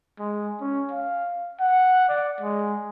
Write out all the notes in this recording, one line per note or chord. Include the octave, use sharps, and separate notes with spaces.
G#3
C#4
F5
F#5
D5
G#3